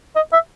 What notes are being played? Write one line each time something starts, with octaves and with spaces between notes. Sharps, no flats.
D#5
E5